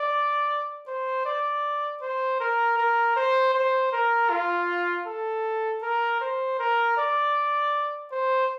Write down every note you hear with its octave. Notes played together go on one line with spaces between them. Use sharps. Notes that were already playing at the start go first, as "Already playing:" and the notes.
Already playing: D5
C5
D5
C5
A#4
A#4
C5
C5
A#4
F4
A4
A#4
C5
A#4
D5
C5